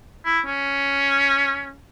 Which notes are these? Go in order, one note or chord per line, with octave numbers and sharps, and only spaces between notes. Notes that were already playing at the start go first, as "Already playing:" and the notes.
E4
C#4